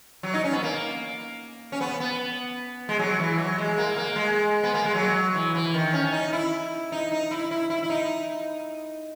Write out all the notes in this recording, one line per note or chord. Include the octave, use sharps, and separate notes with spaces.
F#3
D#4
C#4
B3
A#3
C#4
B3
B3
G#3
F#3
E3
F#3
G#3
A#3
A#3
G#3
B3
A#3
G#3
F#3
E3
E3
D#3
C#4
D#4
E4
D#4
D#4
E4
E4
E4
E4
D#4